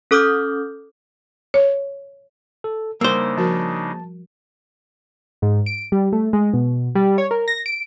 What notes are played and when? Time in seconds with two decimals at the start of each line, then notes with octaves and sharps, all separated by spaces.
0.11 C#4 A4 D6 D#6 F6 G6
1.54 C#5
2.64 A4
3.01 C#3 G3 A#3 D4 D#4 C5 E6
3.38 F3 F#4 A#4 A5
5.42 G#2
5.66 D7
5.92 G3
6.13 A3
6.33 G#3
6.53 B2
6.95 G3
7.18 C#5
7.31 A#4
7.48 A#6
7.66 D7